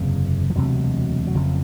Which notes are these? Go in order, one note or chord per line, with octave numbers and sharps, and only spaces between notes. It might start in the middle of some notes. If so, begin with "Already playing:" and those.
Already playing: F#1 E2 C3
F3
E1 D2 C3 F#3
F#3
F#1 F2 C#3 F3